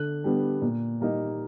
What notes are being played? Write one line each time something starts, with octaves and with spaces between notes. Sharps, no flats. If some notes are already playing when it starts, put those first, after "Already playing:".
Already playing: D3 F#6
G3 B3 D4
A#2
G3 A#3 D#4